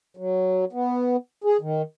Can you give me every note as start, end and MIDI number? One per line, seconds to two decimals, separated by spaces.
0.17 0.65 54
0.73 1.16 59
1.44 1.57 68
1.61 1.82 51